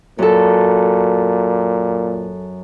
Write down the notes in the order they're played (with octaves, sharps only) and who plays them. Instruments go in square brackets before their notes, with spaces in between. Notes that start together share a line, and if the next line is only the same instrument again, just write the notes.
[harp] F#2 A4 [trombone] A#2